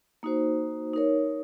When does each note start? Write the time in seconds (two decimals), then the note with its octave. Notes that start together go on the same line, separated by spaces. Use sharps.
0.23 A#3 D#4 F#4 C5
0.93 D#4 A#4 C#5